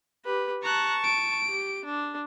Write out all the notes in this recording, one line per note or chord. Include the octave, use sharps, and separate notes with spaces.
G4 B4
A5 A#5 C#6 F#6
D7
G4
D4